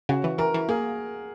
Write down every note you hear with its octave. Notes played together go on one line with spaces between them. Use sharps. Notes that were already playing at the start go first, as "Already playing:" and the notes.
C#3 F#4
E3
E3 A#4
E3
A#3 G#4